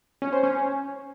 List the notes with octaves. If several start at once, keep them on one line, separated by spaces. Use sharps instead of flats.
C#4
C5
C#4